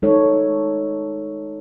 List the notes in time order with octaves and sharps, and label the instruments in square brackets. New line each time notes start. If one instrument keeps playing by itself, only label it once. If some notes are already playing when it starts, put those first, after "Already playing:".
[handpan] G#3 D#4 A4 C#5